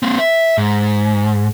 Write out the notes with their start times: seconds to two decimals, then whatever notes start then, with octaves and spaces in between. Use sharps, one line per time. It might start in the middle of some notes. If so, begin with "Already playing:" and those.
0.03 A#3 C4
0.19 E5
0.58 G#2